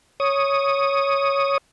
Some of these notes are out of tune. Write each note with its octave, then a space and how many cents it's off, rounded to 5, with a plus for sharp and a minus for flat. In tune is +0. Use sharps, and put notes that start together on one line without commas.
C#5 +0 D#6 +0